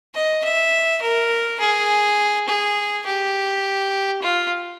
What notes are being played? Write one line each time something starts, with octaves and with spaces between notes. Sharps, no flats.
D#5
E5
A#4
G#4
G#4
G4
F4